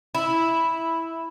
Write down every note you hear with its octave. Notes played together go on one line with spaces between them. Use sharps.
E4